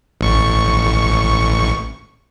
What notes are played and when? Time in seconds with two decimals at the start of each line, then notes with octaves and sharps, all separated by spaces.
0.21 A1 C#6